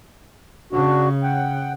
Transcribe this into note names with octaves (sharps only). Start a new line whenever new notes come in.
C#3 D4 F#4
F#5 G5